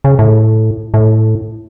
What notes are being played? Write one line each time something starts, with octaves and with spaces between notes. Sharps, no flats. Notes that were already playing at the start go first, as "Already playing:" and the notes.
C#3
A2
A2